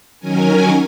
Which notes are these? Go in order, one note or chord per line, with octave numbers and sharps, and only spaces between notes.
D#3 F#3 C#4 A#4 G#5